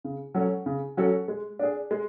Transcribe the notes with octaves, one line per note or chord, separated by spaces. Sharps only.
C#3
F#3 C#4 F#4 A4
C#3
F#3 C#4 F#4 A4
G#3
D4 G#4
G#3